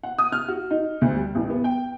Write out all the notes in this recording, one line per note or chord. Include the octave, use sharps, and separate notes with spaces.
F#5
D#6
F6
F#4
D#4
D2
G3
A1
B3
G5